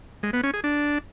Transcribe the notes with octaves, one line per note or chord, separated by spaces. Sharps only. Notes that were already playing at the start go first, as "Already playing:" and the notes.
G#3
B3
C#4
G#4
D4